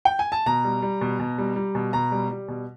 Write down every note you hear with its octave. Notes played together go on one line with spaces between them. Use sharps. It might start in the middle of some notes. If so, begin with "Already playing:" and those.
G5
G#5
A5
B2 A#5
G3
G3
B2
B2
G3
G3
B2
B2 A#5
G3
G3
B2